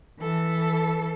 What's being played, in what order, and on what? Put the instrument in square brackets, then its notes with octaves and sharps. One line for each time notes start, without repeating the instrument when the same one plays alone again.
[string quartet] E3 A4